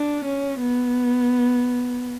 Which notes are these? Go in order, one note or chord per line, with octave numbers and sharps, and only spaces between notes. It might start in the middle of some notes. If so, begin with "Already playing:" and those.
Already playing: D4
C#4
B3